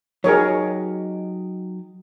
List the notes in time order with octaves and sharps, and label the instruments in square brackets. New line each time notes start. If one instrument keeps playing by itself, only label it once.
[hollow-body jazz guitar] F#3 D#4 G4 [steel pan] G#4 A#4 C#5